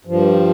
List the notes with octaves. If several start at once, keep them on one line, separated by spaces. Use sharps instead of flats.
G2 F3